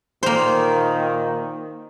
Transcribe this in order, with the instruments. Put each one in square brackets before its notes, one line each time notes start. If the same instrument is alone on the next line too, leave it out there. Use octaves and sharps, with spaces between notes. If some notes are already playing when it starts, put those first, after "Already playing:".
[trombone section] A#2 D#3 [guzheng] A#3 C5